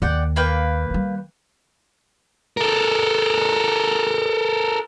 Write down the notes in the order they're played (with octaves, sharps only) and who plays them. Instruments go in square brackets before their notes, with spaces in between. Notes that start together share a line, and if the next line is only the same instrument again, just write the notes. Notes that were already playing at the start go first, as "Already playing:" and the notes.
[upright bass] D#2 [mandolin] D5 F#5 G5
[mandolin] A#3 B4 G5
[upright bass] D#3 G3
[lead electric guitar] A4 A#4